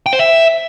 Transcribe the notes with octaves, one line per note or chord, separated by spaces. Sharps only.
G5
C5
E5